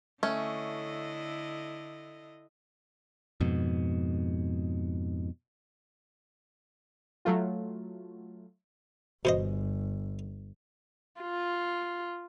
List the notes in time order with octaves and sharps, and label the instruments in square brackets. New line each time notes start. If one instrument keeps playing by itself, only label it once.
[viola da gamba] D3 E4 D#5 [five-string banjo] A3 C#4
[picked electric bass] F2 G#2 B2
[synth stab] F#3 A3 F4
[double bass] G1 [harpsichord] B2 C5 D#5
[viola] F4